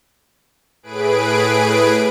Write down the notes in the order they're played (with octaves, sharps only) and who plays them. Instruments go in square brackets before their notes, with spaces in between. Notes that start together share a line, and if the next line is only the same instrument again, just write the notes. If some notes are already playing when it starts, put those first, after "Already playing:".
[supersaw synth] A2 G#4 B4 D7